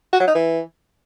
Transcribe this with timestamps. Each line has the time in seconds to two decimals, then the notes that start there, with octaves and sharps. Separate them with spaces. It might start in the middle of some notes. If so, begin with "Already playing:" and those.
0.13 F#4
0.20 F#3
0.28 D#4
0.35 E3